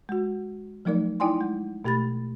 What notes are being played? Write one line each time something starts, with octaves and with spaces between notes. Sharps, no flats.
G#3 F#4
F3 F#3 A3 D#4 A#4 D5
D#4 E4 D5 G5 G#5 C6
G#3
B2 A3 G4 B5 A6